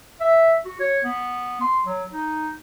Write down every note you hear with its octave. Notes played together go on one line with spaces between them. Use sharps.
E5
F#4
C#5
B3
C6
F#3
D#4